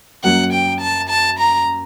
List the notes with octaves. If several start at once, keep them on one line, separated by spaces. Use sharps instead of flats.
F#2 F#3 A#3 F#5
G5
A5
A5
A#5